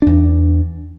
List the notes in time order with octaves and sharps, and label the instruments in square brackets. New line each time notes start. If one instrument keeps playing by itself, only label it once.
[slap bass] E2 D4